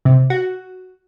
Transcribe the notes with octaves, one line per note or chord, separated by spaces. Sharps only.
C3
F#4